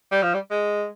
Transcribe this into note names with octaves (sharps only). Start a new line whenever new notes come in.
G3
F3
G3
G#3